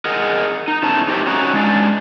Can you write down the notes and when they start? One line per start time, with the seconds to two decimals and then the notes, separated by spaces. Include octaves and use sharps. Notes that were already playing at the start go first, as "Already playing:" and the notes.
0.05 G#4 A#4 D#5 F#5
0.68 D#4
0.83 B2 C#4 E4 A5
1.08 D#4 G4 A#4 C5 D5 E5
1.27 C#4 D#4 F#4 A#5
1.53 G#3 C#4 D4